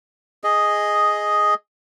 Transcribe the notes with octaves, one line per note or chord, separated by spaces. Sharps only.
G#4 D#5